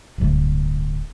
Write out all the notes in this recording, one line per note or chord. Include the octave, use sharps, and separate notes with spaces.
D1 G1 D2